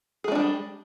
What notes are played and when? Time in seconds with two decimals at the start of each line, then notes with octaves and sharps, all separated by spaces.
0.24 G#4
0.28 G#3
0.32 D4
0.35 G3